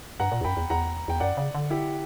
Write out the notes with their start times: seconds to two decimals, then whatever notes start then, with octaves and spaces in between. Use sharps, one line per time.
0.20 G2 F#5 A#5
0.32 A#2
0.41 E2
0.44 F#2 G5 B5
0.57 E2
0.70 E2 F#5 A#5
1.08 E2 G5
1.20 F#2 D5 F#5
1.37 C#3
1.55 D3
1.70 E4 G4